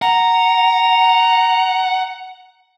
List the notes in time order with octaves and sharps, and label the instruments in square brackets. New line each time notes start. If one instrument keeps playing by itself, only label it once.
[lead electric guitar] F#5 [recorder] A#5